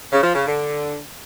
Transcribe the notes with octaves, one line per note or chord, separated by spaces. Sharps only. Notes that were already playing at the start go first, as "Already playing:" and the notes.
C#3
F3
C#3
D3